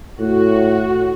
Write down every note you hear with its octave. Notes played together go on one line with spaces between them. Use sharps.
A2 F#4